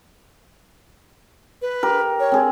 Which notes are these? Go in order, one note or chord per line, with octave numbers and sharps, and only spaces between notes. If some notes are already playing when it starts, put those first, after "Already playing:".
B4
G4 A#4
C#5
C4 G#4